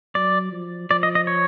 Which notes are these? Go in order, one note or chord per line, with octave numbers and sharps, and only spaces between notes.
F#3 D5
F3
F3 D5
D#5
D#5
C#5